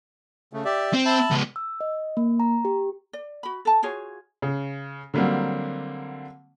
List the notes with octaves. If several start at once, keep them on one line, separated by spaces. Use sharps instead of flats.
C#3 A3
G4 D5 E5
C4
E5 A5 B5
C#2 B3
E6
D#5
A#3
A#5
G4
D5
F#4 B5
A4 A5
F4 F#4 G#4 C#5
C#3
D3 F#3 G3 A#3 C4